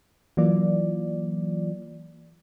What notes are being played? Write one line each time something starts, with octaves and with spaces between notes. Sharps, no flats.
E3 F#3 A#3 F4 D5